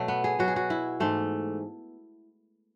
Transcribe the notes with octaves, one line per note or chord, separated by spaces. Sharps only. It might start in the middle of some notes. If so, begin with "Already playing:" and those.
Already playing: B2 F#3 A3
B3
G#4
B2 F#3 F#4
G#4
F#4
E4
G#2 E3 A3